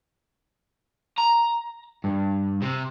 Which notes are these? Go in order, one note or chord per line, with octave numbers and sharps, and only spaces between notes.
A#5
G2
C3